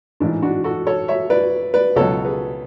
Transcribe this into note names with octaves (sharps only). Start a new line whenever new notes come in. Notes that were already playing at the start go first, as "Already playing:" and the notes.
A1 G#2 E3 D4
D4 F#4
F#4 A4
A4 C#5
C#5 E5
B4 D5
B4 D5
C#2 B2 F#3 A4 C#5
G#4 B4